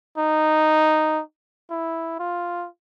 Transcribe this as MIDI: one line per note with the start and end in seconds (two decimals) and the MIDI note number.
0.18 1.21 63
1.71 2.15 64
2.19 2.67 65